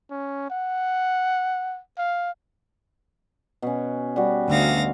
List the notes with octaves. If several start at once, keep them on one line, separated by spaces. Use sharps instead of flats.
C#4
F#5
F5
B2 C#4
G3 F#4
D2 F5 A#6